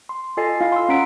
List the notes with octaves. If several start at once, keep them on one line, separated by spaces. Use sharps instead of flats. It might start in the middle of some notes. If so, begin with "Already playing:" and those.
C6
F4 A4 D#5 G#5 A6 C7
E4 F4 F5
C6 E6
C#4 F#5 A#5 B6 D7